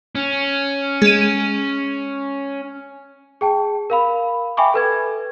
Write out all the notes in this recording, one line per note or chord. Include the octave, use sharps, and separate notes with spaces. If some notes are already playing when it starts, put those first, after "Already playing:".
C#4
G#3 D#7
G#4 G5 A5
A#4 F5 B5
E5 G5 G#5 B5 C#6 D6
A4 B4 G#6